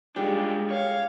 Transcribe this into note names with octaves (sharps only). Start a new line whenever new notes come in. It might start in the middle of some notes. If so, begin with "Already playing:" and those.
G3 G#3 D4 F4 G4
C#5 F5